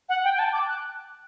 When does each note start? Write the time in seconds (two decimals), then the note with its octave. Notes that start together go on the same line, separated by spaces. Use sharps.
0.09 F#5
0.24 G5
0.34 G5
0.39 A5
0.53 D6
0.68 F#6